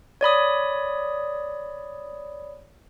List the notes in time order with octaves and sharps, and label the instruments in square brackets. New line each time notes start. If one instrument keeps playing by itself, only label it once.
[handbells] C#5 D5 B5 D#6